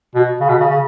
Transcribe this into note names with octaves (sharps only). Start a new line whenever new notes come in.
B2
C#3
B2
C#3
C#3